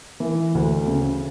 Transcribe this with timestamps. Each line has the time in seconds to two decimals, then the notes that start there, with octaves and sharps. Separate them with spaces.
0.20 E3
0.55 D2
0.87 C#3